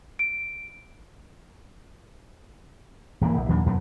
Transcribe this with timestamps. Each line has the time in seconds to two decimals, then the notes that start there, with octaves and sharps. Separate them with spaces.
0.19 D7
3.21 D1 E3 A#3
3.37 A#1
3.49 D#2 A#2 F#3 D4
3.66 F2 B2 F#3